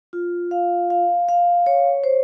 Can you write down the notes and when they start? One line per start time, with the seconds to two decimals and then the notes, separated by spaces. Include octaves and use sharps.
0.13 F4
0.51 F5
0.90 F5
1.28 F5
1.66 C#5
2.04 C5